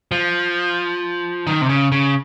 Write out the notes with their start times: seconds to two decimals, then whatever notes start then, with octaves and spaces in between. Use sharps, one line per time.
0.12 F3
1.47 D#3
1.62 C3
1.69 C#3
1.92 C#3